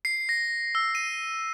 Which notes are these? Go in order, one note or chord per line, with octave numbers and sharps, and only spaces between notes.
C7
A#6
E6
D#7